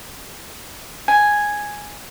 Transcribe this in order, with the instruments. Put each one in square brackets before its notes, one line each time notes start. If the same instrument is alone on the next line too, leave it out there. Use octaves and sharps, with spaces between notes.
[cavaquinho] G#5